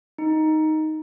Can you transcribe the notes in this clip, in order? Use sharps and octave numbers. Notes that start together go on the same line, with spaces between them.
D#4